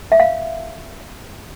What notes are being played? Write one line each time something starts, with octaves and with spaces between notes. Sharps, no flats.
E5
F5